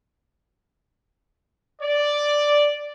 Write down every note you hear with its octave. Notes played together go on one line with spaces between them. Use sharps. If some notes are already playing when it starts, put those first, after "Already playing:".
D5